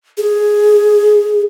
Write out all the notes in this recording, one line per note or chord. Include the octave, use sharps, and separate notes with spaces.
G#4